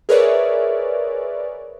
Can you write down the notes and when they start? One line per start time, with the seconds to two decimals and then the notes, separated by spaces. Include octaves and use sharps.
0.09 G#4 A#4 B4 C#5 D5 E5